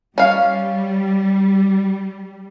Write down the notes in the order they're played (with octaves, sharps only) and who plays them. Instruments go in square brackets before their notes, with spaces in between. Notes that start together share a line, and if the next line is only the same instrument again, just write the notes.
[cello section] G3 [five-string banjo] C#4 F5